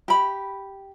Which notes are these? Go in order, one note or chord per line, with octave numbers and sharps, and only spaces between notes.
G4 B5